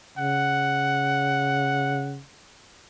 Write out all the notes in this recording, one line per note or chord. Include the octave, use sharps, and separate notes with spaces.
C#3 F#5